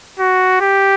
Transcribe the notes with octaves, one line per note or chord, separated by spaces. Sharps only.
F#4
G4